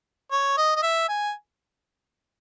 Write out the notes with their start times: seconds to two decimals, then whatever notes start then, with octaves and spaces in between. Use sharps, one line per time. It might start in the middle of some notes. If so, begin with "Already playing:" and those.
0.31 C#5
0.57 D#5
0.76 D#5
0.82 E5
1.09 G#5